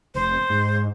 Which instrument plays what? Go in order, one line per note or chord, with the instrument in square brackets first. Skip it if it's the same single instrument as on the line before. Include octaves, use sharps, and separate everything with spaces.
[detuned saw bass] F1 [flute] C5
[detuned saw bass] G#2